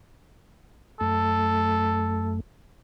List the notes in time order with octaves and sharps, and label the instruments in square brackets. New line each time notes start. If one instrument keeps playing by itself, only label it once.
[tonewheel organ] F#2 A3 [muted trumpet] A4